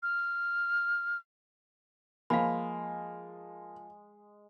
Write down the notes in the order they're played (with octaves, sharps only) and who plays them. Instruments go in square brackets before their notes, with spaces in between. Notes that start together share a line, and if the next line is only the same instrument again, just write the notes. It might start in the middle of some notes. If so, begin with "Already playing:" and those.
[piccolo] F6
[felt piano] F3 [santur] G#3 [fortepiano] A#3 [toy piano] F5 B5